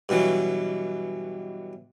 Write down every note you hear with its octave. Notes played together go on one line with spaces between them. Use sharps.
G2 B2 E3 F#3